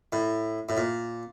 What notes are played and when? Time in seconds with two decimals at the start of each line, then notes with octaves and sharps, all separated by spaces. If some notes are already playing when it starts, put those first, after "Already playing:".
0.12 A2
0.69 A2
0.77 A#2